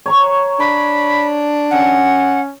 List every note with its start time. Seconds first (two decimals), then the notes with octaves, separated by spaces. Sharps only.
0.06 C#5 A#5 C#6
0.59 D4 B5
1.71 C#4 F#5